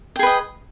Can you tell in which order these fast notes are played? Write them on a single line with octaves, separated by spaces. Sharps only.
G5 G#4 B4 D#5